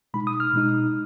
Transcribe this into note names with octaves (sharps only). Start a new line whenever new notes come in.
B2 G#3 D#4 B5
D#6
F6
B2 G#3 D#4